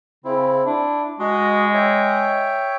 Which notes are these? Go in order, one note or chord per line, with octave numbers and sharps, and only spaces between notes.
C#3 C4 E4
D4 E4
G#3 F#4 D#5
C#5 E5 G5